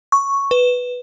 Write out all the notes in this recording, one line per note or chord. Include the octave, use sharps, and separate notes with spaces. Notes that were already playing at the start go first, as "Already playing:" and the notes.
C#6
B4